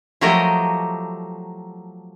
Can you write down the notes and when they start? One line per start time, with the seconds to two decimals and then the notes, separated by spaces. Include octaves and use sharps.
0.21 F3 F#3 A3 G4 A#4 D#5